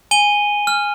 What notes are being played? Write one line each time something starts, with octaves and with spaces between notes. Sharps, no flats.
G#5 D#7 G7
F6